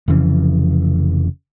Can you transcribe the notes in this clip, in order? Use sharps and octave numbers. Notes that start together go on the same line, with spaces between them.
F1 F2 C#3 E3